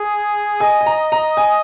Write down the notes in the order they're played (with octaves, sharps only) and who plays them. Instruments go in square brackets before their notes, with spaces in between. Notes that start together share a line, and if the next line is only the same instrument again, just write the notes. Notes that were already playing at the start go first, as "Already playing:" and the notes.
Already playing: [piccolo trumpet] G#4
[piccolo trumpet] D#5 [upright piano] G#5
[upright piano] G#5
A#5
A#5
G#5